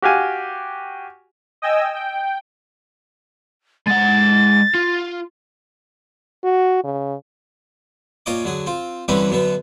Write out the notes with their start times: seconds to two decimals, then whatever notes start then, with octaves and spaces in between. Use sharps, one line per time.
0.02 F#4 G4 F5 G#5
1.62 D#5 G5 G#5 E6
1.95 G5
3.87 G#3 F#5 A6
4.75 F4
6.44 F#4
6.84 C#3
8.26 A#2 F4 C#5 D#5 D6
8.45 D3 F#3 G#4
8.66 C4 F4
9.08 D3 E3 G3 C4 C#4 B4
9.30 F#2 B2 D3 B3